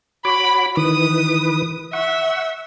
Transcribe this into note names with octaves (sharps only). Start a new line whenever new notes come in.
F#4 C#5 B5 D6
D#3 E3 B4 D#6
E5 F#5 C#6